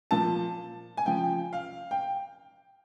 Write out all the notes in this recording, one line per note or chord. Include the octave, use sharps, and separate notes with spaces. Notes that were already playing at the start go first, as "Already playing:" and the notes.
A#2 F3 A5
G#5
C#3 F3 G5
F5
G5